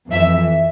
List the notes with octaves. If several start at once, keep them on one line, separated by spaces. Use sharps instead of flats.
F2 E3 E5